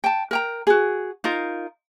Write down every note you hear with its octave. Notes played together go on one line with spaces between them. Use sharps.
G5 A5
A#4 G5 A#5
F#4 G#4
D#4 F4 A#4